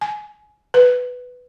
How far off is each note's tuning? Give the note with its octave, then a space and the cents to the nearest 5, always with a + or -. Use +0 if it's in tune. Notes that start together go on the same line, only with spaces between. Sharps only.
G#5 +20
B4 +5